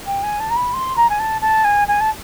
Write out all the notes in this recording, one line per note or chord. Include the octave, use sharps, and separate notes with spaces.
G5
G#5
A5
A#5
B5
C6
A#5
G#5
A5
A5
G#5
G#5
A5